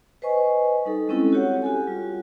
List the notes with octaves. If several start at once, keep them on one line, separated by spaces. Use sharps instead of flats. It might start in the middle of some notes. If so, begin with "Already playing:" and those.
B4 C5 D#5 G#5 C#6
G3 D#4 A4
G3 G#3 C4 C#4 E4 A4
F#4 G4 C#5 F#5
F#4 G4 A4 G#5
G3 F4